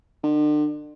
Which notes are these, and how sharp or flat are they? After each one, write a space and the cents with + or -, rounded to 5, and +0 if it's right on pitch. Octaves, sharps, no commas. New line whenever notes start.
D3 +40